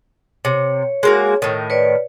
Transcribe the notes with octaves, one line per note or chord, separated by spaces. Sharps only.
C3 C#5
G#3 A#3 F#4
A2 D#3
B4 C#5 D5